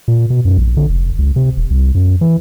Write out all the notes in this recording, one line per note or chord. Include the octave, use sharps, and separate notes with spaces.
A#2
B2
F#2
A#1
D3
F1
C#2
C3
D#1
C2
F#2
E3